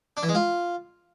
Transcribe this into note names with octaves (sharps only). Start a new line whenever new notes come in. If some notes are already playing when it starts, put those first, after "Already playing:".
D4
E3
G#3
F4